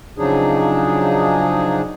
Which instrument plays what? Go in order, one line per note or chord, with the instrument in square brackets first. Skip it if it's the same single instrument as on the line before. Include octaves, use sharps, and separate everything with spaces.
[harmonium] C#3 F3 F#3 D4 D#4 G#4